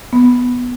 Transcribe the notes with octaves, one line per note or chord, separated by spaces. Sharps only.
B3